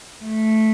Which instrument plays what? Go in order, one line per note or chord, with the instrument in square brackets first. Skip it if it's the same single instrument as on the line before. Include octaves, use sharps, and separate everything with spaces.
[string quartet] A3